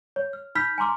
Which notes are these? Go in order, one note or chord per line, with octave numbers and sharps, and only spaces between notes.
C#5
F6
D#4 B5 F6 G6 B6
G#5 A#5 C6 D6 F6